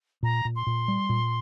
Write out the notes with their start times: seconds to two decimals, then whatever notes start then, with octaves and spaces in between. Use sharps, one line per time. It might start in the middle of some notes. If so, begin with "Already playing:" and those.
0.23 A#2 A#5
0.45 A#2
0.56 C6
0.67 A#2
0.88 G3
1.09 A#2